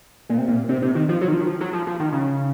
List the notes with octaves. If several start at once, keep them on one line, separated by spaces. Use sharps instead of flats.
A#2
C3
A#2
C3
C3
D#3
F3
F#3
D#3
F3
D#3
F3
F#3
F3
F3
D#3
C#3